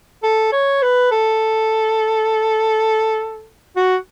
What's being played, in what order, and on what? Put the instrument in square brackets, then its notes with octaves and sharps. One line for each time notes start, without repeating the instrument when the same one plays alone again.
[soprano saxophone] A4
C#5
B4
A4
F#4